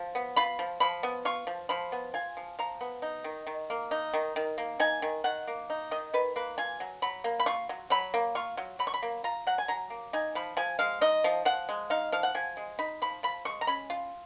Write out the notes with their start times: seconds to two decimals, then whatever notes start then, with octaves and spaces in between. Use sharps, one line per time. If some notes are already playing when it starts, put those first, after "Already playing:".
Already playing: F3
0.15 B3
0.36 F4 B5
0.59 F3
0.80 F3 B5
1.03 B3
1.25 F4 C#6
1.47 F3
1.69 F3 B5
1.92 B3
2.14 F4 G#5
2.37 F3
2.59 F3 A#5
2.81 B3
3.02 D#4
3.24 D#3
3.47 D#3
3.70 A#3
3.91 D#4
4.14 D#3
4.36 D#3
4.58 A#3
4.80 D#4 G#5
5.02 D#3
5.24 D#3 F#5
5.47 A#3
5.70 D#4
5.91 D#3 D#5
6.14 D#3 B4
6.36 A#3 B4
6.58 F4 G#5
6.80 F#3
7.02 F#3 B5
7.24 A#3
7.40 B5
7.46 F4 C#6
7.69 F#3
7.90 F#3 B5
8.14 A#3
8.35 F4 C#6
8.57 F#3
8.79 F#3 B5
8.87 C#6
8.94 B5
9.02 A#3
9.24 F4 A#5
9.47 F#3 F#5
9.58 G#5
9.68 F#3 A#5
9.90 A#3
10.13 D#4 G#5
10.35 F3 B5
10.57 F3 G#5
10.79 G#3 F5
11.01 D#4 D#5
11.24 F3
11.45 F3 F#5
11.69 G#3
11.90 D#4 F5
12.12 F3 F5
12.23 F#5
12.35 F3 G#5
12.57 G#3
12.79 D#4 B5
13.02 F3 B5
13.23 F3 B5
13.45 G#3 C#6
13.61 A#5
13.67 C#4 B5
13.90 F4